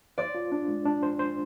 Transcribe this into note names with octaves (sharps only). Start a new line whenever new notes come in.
C5 D5
F4
D4
G#3
D4
C5
C5